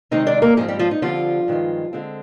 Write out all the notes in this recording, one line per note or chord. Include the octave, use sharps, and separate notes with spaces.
C3 D#3 G#3 C4 D#4 D#5
D4 D5
A#3 A#4
G#2 F3 G#3 C4 G#4
G3 G4
F3 F4
D#4
D3 F3 G3 C4 F4
G2 D#3 G#3
D3 G#3 C4